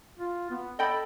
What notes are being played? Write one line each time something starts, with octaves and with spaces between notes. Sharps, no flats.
F4
B3
A4 D#5 G5 B5